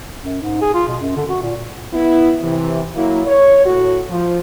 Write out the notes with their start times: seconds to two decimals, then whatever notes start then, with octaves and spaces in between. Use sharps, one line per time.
0.23 F#2
0.42 G#2
0.61 G#4
0.74 F4
0.88 B2
1.01 F#2
1.16 D3
1.28 F#4
1.42 A#2
1.93 B3 E4
2.41 C3 E3
2.95 F#3 A#3 E4
3.26 C#5
3.66 A2 F#4
4.10 F3